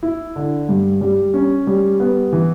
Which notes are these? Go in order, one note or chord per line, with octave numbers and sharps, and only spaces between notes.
E4
D3
G2
G3
C#4
G3
B3
E3